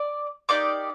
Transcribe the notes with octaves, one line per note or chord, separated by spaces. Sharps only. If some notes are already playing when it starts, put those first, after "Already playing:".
Already playing: D5 D6
A#3 D#4 G4 D5 D6